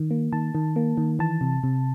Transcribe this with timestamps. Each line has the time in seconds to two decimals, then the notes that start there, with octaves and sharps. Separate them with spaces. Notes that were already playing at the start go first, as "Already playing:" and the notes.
Already playing: D#3
0.11 A#3
0.33 D#3 A5
0.55 D#3
0.76 A#3
0.98 D#3
1.19 E3 A5
1.41 C3
1.63 C3